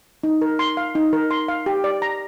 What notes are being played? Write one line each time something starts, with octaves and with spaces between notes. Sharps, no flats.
D#4
A#4
C6
F5
D#4
A#4
C6
F5
G4
D5
A#5